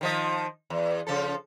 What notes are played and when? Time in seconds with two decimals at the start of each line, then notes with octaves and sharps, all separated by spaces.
0.01 D#3 F3 D#5
0.70 E2
1.07 C#3 F3 A4